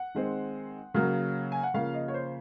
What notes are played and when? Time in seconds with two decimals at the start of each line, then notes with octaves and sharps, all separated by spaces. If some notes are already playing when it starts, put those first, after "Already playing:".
Already playing: F#5
0.15 D#3 G#3 C4
0.94 C#3 F#3 A#3
1.52 G#5
1.63 F#5
1.74 C#3 F3 A#3 F5
1.94 D#5
2.08 C#5
2.14 C5